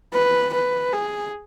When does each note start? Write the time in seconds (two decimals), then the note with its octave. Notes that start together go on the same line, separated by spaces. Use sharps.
0.14 B4
0.53 B4
0.93 G#4